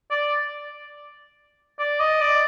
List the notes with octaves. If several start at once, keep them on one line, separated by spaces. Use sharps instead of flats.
D5
D5
D#5
D5